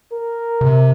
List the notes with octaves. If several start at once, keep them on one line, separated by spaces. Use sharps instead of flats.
A#4
C3